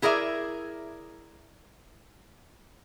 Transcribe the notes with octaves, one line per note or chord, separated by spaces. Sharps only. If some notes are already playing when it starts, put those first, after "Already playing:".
E4 G#4 A#4 D5 E5